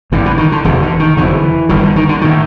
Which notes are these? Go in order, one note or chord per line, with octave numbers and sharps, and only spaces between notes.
A1 G2 D3 E3
E3
D#3
D3
E1 E2 C3 D#3
D3
D#3
F#1 F2 D3 E3
G1 G2 D3 D#3
D3
D#3
D3
A2 D#3